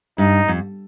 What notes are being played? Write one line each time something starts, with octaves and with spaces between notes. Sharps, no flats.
G2 D#4
F2